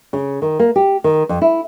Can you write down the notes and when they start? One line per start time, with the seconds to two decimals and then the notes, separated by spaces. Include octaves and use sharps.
0.13 C#3
0.42 D#3
0.59 A#3
0.76 G4
1.04 D#3
1.29 F2
1.42 E4